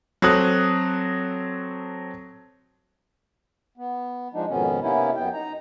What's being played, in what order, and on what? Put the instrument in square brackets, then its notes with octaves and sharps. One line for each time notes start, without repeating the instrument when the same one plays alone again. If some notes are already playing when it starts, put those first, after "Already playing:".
[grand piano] F#3 C4 A4 D#6 F#6
[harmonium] B3
F3 G#3 D4 D#4
F2 G#2 B2 D#3 B3 C#4
C3 A#3 B3 C#4 D#4 E4
F#2 B3 G5
D#4 A#5